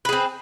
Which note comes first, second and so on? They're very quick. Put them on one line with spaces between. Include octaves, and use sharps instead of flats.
B4 G#4 C4